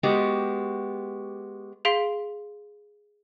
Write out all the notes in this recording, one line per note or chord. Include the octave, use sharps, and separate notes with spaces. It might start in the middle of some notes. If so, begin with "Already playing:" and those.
G#3 B3 F#4 G4
G#4 F5 C6 B6 D7